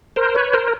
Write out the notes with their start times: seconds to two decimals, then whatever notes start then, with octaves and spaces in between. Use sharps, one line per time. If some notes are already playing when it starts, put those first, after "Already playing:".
0.16 A#4 C5
0.35 B4 C#5
0.53 A#4 C5